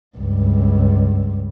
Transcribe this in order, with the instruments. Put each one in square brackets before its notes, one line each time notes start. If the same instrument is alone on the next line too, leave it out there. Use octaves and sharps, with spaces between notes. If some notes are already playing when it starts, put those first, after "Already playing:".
[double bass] C#2 G2